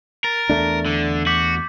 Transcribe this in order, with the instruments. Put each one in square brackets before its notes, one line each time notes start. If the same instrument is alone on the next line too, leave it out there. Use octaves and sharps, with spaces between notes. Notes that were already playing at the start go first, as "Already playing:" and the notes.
[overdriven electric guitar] A#4 [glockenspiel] A6
[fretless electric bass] E2 A3 D4
[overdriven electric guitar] D3
[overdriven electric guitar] F#4 [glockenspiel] D6 G6 B6